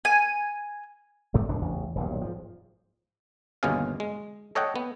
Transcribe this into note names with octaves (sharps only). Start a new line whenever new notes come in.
G#5
G#2 G3 A3
E1 G2 G#3 D4
A1 E2 C#3
D#1 B1 G2
G#2 F3
G1 D#2 B2 C#4 G#4 F5
G#3
A4 C#5 D#5 F#5 G5
B3